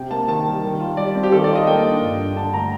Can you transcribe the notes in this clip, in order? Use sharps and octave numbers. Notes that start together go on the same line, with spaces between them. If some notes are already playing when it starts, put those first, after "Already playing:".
Already playing: C3 G5
A#3 A5
D#3 A5
G3
D#3
F4
G3 D5
C4
G4
D#3 A4
D5
F4 D#5
A#3 G5
D4
G2
D4
D3 A5
A3 A#5